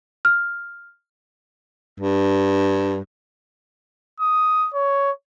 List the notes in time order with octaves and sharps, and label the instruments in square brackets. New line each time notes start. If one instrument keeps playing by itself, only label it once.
[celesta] F6
[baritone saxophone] G2
[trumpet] D#6
C#5